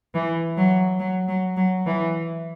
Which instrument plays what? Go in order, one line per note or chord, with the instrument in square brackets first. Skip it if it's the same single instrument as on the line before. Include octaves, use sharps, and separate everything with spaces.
[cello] E3
F#3
F#3
F#3
F#3
E3